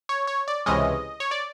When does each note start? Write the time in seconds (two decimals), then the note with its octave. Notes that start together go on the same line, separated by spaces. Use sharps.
0.09 C#5
0.27 C#5
0.48 D5
0.66 C#2 C3 E3 G#3 C#4 D#5
1.20 C#5
1.31 D5